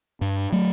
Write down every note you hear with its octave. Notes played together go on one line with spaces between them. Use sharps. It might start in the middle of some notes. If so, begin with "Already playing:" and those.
G2
F#3 A3